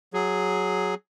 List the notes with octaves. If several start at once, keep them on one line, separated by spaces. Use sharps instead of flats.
F#3 G#4